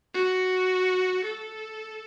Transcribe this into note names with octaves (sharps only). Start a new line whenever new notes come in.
F#4
A4